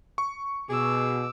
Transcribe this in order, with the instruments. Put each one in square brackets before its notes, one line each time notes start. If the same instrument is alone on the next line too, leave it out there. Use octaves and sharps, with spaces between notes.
[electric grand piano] C#6
[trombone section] B2 [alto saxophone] G#4 [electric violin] D6 E6